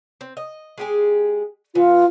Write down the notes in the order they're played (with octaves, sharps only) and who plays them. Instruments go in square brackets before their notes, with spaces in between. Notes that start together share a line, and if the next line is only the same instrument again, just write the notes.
[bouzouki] C4
D#5
G#3 G4 G#4
[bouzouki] E3 B3 [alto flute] F4